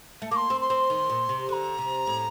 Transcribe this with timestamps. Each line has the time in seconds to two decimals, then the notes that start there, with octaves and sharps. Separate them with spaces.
0.22 A3
0.31 A#3 C6 D6
0.50 C4
0.60 C6
0.70 C4
0.90 D#3
1.10 A#2
1.29 C3
1.49 D3 A#5 C6
1.78 C3
2.07 A2